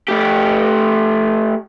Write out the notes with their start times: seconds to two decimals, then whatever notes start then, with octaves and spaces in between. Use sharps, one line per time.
0.09 A3 G4